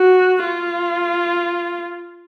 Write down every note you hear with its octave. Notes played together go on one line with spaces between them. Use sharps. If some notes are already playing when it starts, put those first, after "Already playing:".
Already playing: F#4
F4